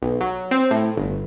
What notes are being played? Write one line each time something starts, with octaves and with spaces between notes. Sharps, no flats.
B1
F#3
C4
A2
G1